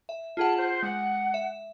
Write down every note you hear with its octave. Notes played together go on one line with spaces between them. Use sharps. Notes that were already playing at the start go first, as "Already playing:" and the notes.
E5
F4 G#4 F#5 A5
C5
G#3 F#5
E5